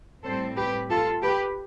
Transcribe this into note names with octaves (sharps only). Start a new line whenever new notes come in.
A2 G3 C4 A4 C5
G4 B4
F4 A4
G4 B4